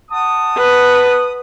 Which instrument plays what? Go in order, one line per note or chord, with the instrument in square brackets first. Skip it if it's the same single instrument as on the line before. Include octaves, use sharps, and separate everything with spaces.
[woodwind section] F#5 A5 D#6
[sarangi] B4